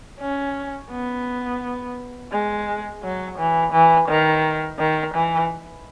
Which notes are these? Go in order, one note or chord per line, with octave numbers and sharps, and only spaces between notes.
C#4
B3
G#3
F#3
E3
E3
D#3
D#3
E3